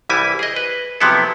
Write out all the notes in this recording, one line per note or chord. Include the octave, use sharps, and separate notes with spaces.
C2 E3 G3 E4 G#5
G#4 D#5
B4
C3 F3 F#3 B3 E4 A4